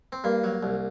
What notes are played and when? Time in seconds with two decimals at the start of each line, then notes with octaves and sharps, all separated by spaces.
0.12 C4
0.24 G2 A#3
0.44 F#3
0.63 C2